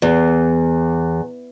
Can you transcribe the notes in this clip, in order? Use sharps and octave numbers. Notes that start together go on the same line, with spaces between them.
E2